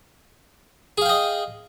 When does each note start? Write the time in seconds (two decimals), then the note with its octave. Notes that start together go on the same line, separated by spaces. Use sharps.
0.98 G#4
1.02 F5
1.05 G5
1.09 D#5